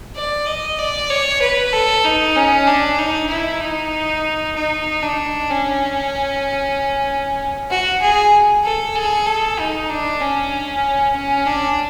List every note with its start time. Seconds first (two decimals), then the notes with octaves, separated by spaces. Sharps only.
0.16 D5
0.46 D#5
0.79 D5
1.10 C#5
1.41 B4
1.72 A4
2.04 D#4
2.35 C#4
2.66 D4
2.98 D#4
3.29 E4
3.61 D#4
4.55 D#4
5.02 D4
5.50 C#4
7.70 F#4
8.01 G#4
8.63 A4
8.95 G#4
9.26 A4
9.58 D#4
9.89 D4
10.20 C#4
11.15 C#4
11.46 D4